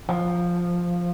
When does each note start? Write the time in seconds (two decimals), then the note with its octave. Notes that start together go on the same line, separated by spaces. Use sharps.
0.09 F3